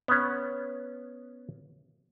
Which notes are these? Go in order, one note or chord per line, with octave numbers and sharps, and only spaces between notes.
B3 C#4